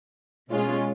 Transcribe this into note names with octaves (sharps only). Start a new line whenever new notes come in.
B2 G#3 C#4 F4